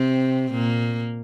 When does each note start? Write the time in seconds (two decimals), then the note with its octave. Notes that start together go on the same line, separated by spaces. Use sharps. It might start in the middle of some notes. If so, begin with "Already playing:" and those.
Already playing: C3 C4
0.51 A#2 A#3